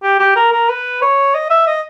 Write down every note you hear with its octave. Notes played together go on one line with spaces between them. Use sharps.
G4
G4
A#4
A#4
B4
C#5
D#5
E5
D#5